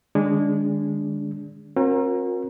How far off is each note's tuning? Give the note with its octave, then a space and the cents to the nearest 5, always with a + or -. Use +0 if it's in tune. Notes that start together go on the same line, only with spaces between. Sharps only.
D3 +45 G#3 -20 D4 -25
C#4 -45 F#4 -40 A#4 +10